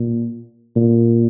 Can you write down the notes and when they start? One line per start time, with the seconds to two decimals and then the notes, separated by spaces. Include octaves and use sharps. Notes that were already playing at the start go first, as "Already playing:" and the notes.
Already playing: A#2
0.76 A#2